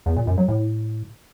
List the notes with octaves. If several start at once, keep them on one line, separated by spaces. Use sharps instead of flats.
E2
A#2
F#2
F#3
A2